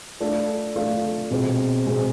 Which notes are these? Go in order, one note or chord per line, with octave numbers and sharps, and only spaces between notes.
A3 D4 F4 A4
A3 D4 F4 A4
B2 G#3 C4
B2 G#3 C4